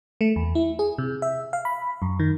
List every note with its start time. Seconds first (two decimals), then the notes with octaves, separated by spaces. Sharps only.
0.21 A3
0.36 E2
0.55 E4
0.79 G#4
0.98 C3
1.22 E5
1.53 F5
1.65 B5
2.02 F#2
2.20 D#3